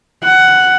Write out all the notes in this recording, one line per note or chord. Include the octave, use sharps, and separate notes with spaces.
F#5